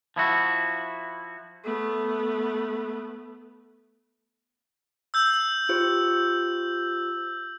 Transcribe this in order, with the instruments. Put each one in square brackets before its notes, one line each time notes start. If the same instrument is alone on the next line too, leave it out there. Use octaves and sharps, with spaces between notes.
[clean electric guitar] F3 E4 F#4
[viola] A3 B3
[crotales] E6 G6
[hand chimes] F4 G4 C5